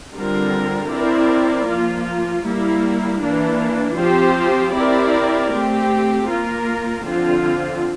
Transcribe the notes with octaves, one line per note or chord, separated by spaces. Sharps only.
D3 G3 C4 F4 A#4
C4 E4 A#4 D5
F3 A#3 F4
G3 A#3 E4
E3 A#3 D4
F3 C4 G4 C5
C4 E4 G4 A#4 D5
A3 C4 G4
A#3 F4 A#4
D3 F3 C4 F4